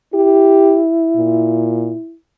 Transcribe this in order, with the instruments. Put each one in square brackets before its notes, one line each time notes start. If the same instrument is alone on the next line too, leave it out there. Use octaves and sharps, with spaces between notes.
[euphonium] E4 [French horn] G4
[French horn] A#2